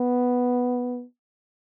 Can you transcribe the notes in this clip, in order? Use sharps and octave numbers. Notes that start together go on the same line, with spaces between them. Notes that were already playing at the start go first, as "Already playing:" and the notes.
Already playing: B3